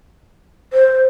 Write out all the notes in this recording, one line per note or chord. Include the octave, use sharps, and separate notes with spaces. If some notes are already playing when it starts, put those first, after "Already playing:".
C5